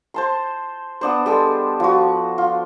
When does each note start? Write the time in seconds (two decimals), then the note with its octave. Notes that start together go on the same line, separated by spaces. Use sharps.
0.14 C5 A5 C6
1.01 B3 D4 C5
1.26 G3 G#3 A4 A5
1.80 F3 F#4
2.38 F4